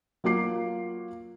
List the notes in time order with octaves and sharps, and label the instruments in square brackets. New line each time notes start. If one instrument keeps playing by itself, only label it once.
[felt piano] F#3 A#3 F4 D6 C7